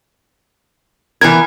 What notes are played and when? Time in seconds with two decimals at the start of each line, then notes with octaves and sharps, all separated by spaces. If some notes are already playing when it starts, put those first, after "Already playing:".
1.21 E3 B3 A#4 G#6